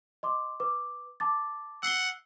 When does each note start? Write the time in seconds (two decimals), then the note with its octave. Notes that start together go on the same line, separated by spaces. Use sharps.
0.23 D#5 C6 D6
0.60 B4 D6
1.20 A5 D6 A6
1.83 F#5 E6 C7 G7